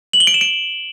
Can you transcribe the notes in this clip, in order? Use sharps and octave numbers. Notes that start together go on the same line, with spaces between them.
F#7
G7
D7
E7
D7